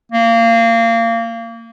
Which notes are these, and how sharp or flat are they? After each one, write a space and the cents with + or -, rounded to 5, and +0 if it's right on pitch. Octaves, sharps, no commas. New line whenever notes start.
A#3 -25